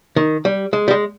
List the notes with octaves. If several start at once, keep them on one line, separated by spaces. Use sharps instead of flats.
D#3
G3
G#3
G3
G#3